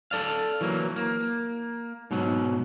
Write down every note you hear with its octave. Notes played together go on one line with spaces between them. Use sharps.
A4 D5 F5
E3 F#3 A#3
A#3
G#2 B2 F#3